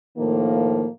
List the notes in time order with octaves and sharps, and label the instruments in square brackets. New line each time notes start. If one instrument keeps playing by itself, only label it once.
[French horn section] A2 D#3 F3 A#3